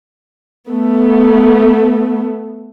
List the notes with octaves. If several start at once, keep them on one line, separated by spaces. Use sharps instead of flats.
A3 B3